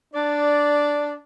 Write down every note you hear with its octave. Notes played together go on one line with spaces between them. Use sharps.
D4 D5